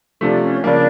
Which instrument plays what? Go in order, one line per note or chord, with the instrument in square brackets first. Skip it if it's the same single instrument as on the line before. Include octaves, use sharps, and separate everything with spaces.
[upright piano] C3 F3 A3 [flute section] D4
[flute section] C#4
[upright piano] C#3 F3 A#3 [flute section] D4